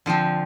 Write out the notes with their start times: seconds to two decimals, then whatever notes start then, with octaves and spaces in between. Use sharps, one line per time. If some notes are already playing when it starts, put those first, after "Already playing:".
0.06 D3 F3 C4